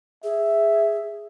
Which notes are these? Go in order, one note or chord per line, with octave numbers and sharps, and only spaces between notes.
G#4 E5